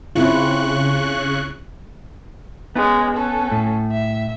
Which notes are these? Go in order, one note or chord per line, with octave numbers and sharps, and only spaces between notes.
C#3 C4 E4 F4 C#6 F#6
G#3 B3 C#4
C#4 A4
A2
E5